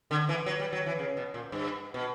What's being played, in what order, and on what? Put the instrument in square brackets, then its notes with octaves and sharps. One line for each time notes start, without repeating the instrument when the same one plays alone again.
[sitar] D3
E3
F#3
G3
F#3
E3
C#3
B2
A#2
G2
B2